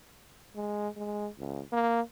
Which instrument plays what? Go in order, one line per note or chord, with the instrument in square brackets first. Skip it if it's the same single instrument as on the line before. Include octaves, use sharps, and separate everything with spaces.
[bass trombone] G#3
G#3
C#2
A#3